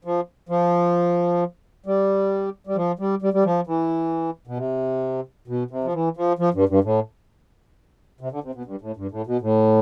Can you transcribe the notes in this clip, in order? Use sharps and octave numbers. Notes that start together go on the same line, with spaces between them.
F3
F3
G3
G3
F3
G3
G3
G3
F3
E3
B2
C3
B2
C3
F3
E3
F3
F3
G2
G2
A2
C3
D3
C3
B2
G2
A2
G2
A2
B2
A2